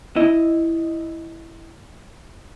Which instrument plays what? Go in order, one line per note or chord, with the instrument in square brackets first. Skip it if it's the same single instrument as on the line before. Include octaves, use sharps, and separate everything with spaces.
[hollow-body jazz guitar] E4 D#5